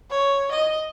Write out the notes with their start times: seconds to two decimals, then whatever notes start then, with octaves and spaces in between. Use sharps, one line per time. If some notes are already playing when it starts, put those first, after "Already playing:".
0.10 C#5
0.52 D#5